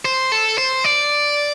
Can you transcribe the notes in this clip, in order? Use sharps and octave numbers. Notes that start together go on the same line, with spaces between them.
C5
A4
C5
D5